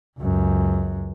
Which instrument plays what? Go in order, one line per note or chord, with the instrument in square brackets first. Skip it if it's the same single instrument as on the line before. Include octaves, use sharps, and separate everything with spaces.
[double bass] C#2 F#2